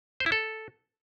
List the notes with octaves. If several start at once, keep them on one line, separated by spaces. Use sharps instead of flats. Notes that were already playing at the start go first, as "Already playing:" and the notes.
C5
E4
A4